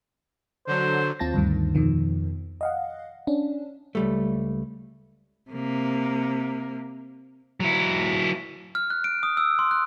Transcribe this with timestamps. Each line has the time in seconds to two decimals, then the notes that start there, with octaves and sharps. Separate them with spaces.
0.67 D3 F#3 C5
1.19 D#2 C4 F4 A5 A6 A#6
1.34 D2 G2 D#3
1.75 F2 B2 D#3 F3
2.61 D#5 F5 F#5
3.27 C#4 D4
3.95 C#2 G3 A3
5.51 C3 A#3
7.60 F#3 E4
8.75 F6
8.90 F#6
9.04 D7
9.23 D#6
9.37 E6
9.59 C6
9.71 F#6